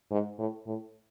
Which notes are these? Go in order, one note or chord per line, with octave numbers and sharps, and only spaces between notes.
G#2
A2
A2